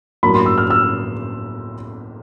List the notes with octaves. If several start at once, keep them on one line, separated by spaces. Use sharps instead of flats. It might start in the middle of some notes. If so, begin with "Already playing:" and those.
A2 F#3 A#3 D4 B5
C6
E6
F6
E6